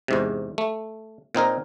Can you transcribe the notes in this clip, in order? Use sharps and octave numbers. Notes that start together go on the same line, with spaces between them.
E2 G#2 C3
A3
A#2 C4 D#4 A#4